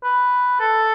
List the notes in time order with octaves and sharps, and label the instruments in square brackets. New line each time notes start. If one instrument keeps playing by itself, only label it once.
[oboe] B4
A4